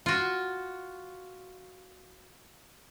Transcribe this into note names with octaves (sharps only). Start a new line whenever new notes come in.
F4 F#4